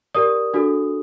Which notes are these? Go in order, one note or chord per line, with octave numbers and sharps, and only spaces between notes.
G4 A#4 D5 D#6
D4 F#4 A4